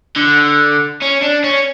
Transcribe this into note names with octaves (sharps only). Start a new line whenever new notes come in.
D3
C#4
D4
C#4